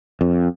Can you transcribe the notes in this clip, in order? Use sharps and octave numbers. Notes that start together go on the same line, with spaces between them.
F2